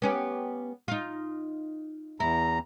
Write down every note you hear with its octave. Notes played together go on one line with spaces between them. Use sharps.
B3 C#4 G4
D#4 F4
E2 E4 A#5